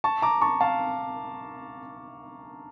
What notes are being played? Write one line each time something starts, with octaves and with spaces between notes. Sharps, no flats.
A5 C#6
A#5 D6
A5 C#6
F5 A5